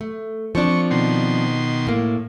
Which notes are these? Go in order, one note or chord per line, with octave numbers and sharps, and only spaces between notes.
A3
F3 C4 D4 C#6
B2 D#3 C6
A2 A#3